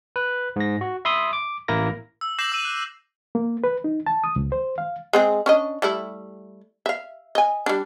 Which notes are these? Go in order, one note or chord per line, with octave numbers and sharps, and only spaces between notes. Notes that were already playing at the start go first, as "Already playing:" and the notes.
B4
G#2 A#6
F#4
E5 B5 C6 D#6
D6
A1 A#3 E4 A#4 A#6
E6
D6 G6 A#6 C7 E7 F#7
E6 D#7
F#6
A#3
B4
D#4
A5
D#6
C#2
C5
F5
G#3 C4 G#4
C#4 D4 D#5
G3 A3 E4
E5 F5
D#5 G#5
G3 D4